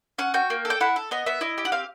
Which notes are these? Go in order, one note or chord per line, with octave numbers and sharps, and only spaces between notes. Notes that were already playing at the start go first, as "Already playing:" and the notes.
C#4 F#5
F#4 G5
A#3
A4
G5
E4 F#5
A4
B3 D#5
B3 E5
E4 D#5
G4
F#5
C4 F5